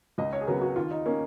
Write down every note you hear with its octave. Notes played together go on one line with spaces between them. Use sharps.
C#2 D#5
C#5
G#4
C#3 F#3 B3 A#4
F#4
D#2 F4
D#4
D#3 A#3 C#4